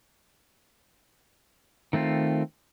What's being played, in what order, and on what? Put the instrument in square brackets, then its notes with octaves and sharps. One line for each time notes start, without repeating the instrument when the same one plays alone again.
[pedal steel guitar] D#3 A3 C4 F4